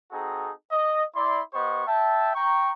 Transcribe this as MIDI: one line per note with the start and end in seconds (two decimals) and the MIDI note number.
0.11 0.51 60
0.11 0.51 63
0.11 0.51 66
0.11 0.51 68
0.11 0.51 69
0.11 0.51 82
0.71 1.03 75
1.16 1.41 64
1.16 1.41 74
1.16 1.41 84
1.53 1.82 59
1.53 1.82 67
1.53 1.82 72
1.53 1.82 75
1.53 1.82 85
1.86 2.33 76
1.86 2.33 79
1.86 2.33 81
2.35 2.72 79
2.35 2.72 82
2.35 2.72 85